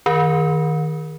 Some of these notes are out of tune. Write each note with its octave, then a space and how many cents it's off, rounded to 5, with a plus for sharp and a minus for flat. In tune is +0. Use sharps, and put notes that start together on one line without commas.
D#3 +0 A#4 +25